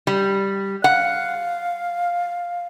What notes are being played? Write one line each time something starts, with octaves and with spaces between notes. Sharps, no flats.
G3
F5 F#5